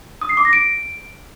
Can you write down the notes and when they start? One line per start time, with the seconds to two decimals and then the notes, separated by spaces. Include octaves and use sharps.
0.21 D#6
0.29 C7
0.37 D6
0.45 A#6
0.53 D7